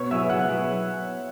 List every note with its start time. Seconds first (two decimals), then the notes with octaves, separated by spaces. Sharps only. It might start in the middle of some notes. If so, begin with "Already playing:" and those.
Already playing: B2 B3 F#4 C#5 C#6
0.10 F#3 E4 G#4 E5 E6
0.29 B2 F#5 F#6
0.48 F#3 E4 G#4